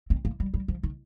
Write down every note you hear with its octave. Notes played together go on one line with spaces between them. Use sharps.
C4
A#3
G3
G3
F3
D#3